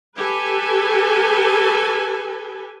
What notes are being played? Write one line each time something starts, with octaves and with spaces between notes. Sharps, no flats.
G4 A4 B4 G#5